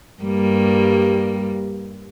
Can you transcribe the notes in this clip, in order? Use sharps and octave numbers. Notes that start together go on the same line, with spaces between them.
G2 G3 A#3